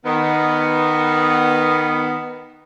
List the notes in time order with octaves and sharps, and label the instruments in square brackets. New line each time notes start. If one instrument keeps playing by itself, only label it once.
[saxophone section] D#3 B3